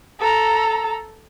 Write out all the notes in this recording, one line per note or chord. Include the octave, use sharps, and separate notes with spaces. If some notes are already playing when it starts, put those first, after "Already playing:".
A4 A#5